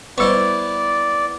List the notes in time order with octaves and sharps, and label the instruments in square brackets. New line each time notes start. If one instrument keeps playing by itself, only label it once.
[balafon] G3 C#6 [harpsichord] B3 E4 C5 [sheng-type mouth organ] D5